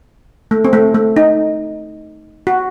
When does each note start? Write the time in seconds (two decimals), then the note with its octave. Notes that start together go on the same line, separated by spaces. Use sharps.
0.51 A3
0.65 C4
0.73 A3
0.95 A3
1.16 D#4
2.47 F#4